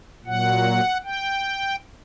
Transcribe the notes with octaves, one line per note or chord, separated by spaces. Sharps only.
A#2 F#3 F#5
G5